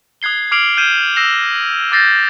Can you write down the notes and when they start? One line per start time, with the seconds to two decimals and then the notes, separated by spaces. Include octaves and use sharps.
0.22 D#6 F#6 G#6 C7 G7
0.51 D6 F6 C7 D7 F7 F#7
0.77 F6 G6 G#6 D#7 E7 G7
1.16 E6 F#6 A#6 C7 E7 F7
1.92 D6 F6 G6 A6 A#6 C7